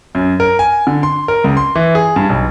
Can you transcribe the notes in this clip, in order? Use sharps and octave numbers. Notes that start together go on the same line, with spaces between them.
F#2
A#4
G#5
D3
C6
A#4
C#2
C6
E3
G#4
G2
B1